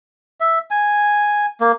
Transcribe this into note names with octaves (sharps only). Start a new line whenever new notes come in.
E5
G#5
A#3